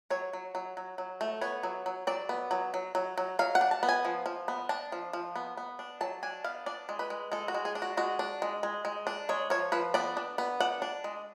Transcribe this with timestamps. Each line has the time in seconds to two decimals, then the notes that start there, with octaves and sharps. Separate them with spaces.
0.10 F#3 C#5
0.33 F#3
0.55 F#3
0.77 F#3
0.98 F#3
1.21 A3
1.41 B3 C#5
1.63 F#3
1.86 F#3
2.07 F#3 D5
2.29 B3
2.51 F#3
2.74 F#3
2.95 F#3
3.18 F#3
3.39 F#3 F5
3.55 F#5
3.61 D4
3.71 A5
3.83 B3
3.89 G#5
4.05 F3
4.26 F3
4.48 B3
4.69 D4 A5
4.92 F3
5.13 F3
5.36 B3
5.57 B3
5.79 D4
6.01 F#3 A5
6.23 D4 G#5
6.44 B3 F5
6.66 D4 D5
6.89 G#3
6.99 B4
7.10 G#3
7.32 G#3 A4
7.48 F#4
7.54 G#3
7.65 G#4
7.75 D4
7.82 F#4
7.97 G#3 F#4
8.19 D4
8.42 G#3
8.63 G#3
8.85 G#3
9.07 D4
9.29 G#3 C#5
9.50 F3 C#5
9.72 F3 B4
9.94 B3 D5
10.17 D4
10.38 B3
10.60 D4 F#5
10.82 D4
11.04 G#3